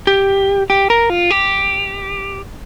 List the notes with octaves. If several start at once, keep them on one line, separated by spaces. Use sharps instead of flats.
G4
G4
A#4
F4
G4